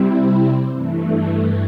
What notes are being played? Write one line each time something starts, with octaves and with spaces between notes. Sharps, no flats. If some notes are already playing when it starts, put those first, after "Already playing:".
Already playing: C3 G3 C4 E4
G2 E3 A3